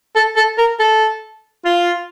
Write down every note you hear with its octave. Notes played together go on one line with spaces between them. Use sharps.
A4
A4
A#4
A4
F4